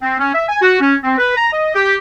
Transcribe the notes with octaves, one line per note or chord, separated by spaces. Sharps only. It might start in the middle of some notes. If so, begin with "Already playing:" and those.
C4
C#4
E5
G#5
F#4
C#4
C4
B4
A#5
D#5
G4